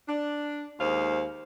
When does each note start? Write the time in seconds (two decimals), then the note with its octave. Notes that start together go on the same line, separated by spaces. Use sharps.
0.08 D4
0.80 D#2 G#3 C5 F5